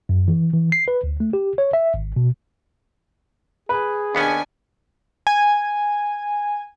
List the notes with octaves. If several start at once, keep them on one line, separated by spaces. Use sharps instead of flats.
F#2
E3
E3
C7
B4
D2
A3
G4
C#5
E5
G#1
B2
G#4 B4
D#2 B3 C#4 D4 G#5
G#5